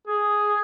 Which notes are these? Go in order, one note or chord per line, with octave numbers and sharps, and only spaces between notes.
G#4